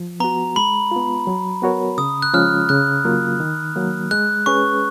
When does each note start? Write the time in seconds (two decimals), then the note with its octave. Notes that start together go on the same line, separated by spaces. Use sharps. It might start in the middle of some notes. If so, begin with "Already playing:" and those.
Already playing: F3
0.20 B3 F#4 A#5
0.56 G#3 B5
0.91 B3 F4
1.27 F#3
1.62 B3 F#4 A#4 C#5
1.98 C#3 D#6
2.22 F#6
2.33 F3 G#3 C#4 F4 F6
2.69 C#3 F#6
3.05 F#3 A#3 F4
3.40 D#3
3.76 F#3 A#3
4.11 G#3 F#6
4.46 C#4 G#4 B4 C#6